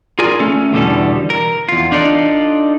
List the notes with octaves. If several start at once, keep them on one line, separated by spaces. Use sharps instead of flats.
F4 G#4 A#4 D5 G#5
A3 C#4 A4
E2 B2 D3 G3 A4
A#4
E2 F4
D4 D#4 F4 A4 D5